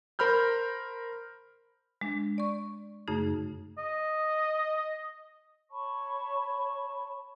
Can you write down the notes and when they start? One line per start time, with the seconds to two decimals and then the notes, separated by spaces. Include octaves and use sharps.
0.19 A#4 C5 B5 F6 G6
2.01 G#3 D4
2.38 D5 C#6
3.08 F#2 C#3 A3 D#4 G#4
3.78 D#5
5.70 C#5 A5 B5 C#6